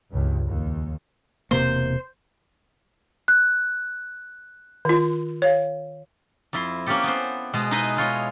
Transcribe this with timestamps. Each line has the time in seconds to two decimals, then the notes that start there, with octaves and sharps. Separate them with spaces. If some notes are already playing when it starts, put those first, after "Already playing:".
0.11 C#2 G2
0.47 D#2
1.51 E1 C3 A#3 C5
3.28 F#6
4.85 D#3 F4
5.42 C#5 F5
6.53 F2 E4 C6
6.87 A#3 C#4 E4 G4 A4
7.04 B3 C5
7.54 B2 G#3
7.71 D#4 E4 G#4 B4 D#5
7.97 E4 F4 C#5 D#5